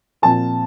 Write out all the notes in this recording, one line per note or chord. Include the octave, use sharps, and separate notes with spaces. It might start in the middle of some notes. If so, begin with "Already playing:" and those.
A#2 F3 C4 A5